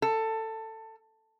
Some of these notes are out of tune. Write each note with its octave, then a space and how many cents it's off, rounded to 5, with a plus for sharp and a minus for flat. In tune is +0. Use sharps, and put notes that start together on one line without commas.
A4 +15